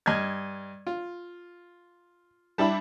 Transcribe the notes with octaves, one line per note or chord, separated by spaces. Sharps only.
G2 D#5 F6 G#6
F4
G3 D4 E4 A5 B5